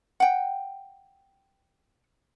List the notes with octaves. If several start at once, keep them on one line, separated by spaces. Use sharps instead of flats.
F#5 G5